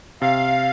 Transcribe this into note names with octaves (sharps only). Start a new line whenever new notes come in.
C3 F5